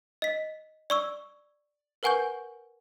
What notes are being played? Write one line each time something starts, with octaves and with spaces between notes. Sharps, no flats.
D#5 B6
D5 C#6 E6
A#4 B4 F#5 G#5 C#6 G6